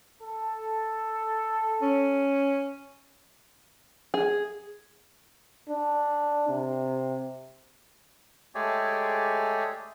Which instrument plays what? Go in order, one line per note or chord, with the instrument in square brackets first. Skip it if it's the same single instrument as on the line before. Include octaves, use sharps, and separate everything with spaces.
[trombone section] A4
[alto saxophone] C#4
[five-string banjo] G#4
[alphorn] D4
C3
[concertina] G#3 A3 G4 G#4 C#5 D5